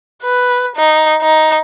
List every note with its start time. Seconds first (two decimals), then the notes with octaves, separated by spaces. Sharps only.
0.23 B4
0.76 D#4
1.22 D#4